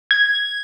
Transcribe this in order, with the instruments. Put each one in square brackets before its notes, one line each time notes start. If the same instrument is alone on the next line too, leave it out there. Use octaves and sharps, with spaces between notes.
[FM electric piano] G#6